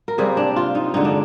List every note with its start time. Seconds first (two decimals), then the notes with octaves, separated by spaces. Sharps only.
0.08 A#4
0.18 C3 G3 A#3 G#4
0.37 D4
0.56 F4
0.75 D#4
0.94 G2 D3 G#3 D#4
1.05 D4